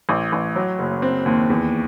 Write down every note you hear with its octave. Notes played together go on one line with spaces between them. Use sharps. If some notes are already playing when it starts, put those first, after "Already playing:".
A1
A1
F#3
F#1
C4
D#2
E2